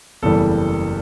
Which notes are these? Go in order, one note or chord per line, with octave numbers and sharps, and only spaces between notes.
F#1 E2 C#3 E3 G3 A4